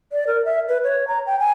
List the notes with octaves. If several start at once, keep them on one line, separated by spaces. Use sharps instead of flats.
D5
A#4
E5
B4
C#5
A#5
G5
G#5